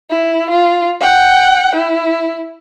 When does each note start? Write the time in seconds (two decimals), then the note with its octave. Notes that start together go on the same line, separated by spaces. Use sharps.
0.10 E4
0.50 F4
1.00 F#5 G5
1.75 E4